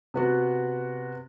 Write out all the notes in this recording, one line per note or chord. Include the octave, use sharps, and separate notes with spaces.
C3 B3 F#4